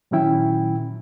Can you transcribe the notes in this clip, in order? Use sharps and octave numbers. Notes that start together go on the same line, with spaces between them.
A#2 D#3 F#3 C#4 E4 G5